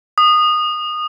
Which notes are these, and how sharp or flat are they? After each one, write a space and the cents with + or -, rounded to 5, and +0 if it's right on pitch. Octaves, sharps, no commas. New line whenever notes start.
D#6 -20